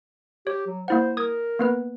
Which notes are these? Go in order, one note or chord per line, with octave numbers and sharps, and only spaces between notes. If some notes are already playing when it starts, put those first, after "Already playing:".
G4 C#5
F#3
A#3 E4 C5 F#5
A#4 D#6 G#6
A#3 B3 B4